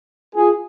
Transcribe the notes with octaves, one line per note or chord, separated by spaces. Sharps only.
F4 G#4